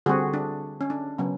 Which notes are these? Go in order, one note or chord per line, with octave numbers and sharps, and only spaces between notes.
D3 G3 C4 F#4 G#4
D4
C#4
D4
C#3 F#3 B3 C#4